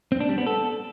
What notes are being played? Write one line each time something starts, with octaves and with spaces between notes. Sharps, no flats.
C4
D4
G3
B3
A4